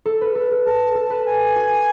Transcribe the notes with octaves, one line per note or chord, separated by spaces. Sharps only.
A4
B4
A4
A4
A4 A5
A4
B4
G#5
F#4